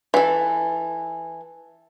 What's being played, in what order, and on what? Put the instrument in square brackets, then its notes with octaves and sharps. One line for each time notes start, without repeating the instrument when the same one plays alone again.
[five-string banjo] E3 A4